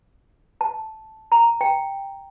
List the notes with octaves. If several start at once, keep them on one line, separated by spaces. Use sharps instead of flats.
A5
A#5
G5